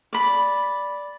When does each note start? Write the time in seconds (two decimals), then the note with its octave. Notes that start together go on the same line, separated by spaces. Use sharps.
0.13 D5 B5